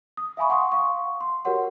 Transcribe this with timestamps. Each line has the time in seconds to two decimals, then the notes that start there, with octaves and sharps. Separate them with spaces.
0.17 D#6
0.37 E5 F5 G#5 B5 C#6
0.49 F#5 C6 C#6 D#6
0.72 F5 C#6
1.21 C6
1.45 F#4 G4 A#4 C#5 F#5 C6